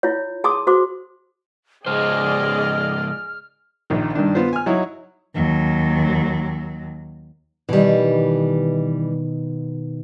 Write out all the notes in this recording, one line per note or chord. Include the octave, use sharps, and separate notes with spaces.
E4 F4 C#5
G#4 A5 C6 D6 D#6
F#4 C5 C6 D6
G#2 C#3 G#4 C5 D5 D#5 F6
A#1 D#3
G2 D#3 D4
B3 F4 C5
G#5 F6
F#3 D#4 E4 C#5
D#2 F#3
B2 D#3 E3 G3